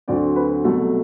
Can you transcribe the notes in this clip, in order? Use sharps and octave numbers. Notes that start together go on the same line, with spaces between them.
D2 D3 F#3 C4 D5
B4
C2 B2 F#3 A3 A4